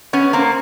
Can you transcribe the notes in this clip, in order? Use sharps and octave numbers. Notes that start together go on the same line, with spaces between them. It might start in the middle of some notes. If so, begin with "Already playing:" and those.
B3 C#4
A#3 C4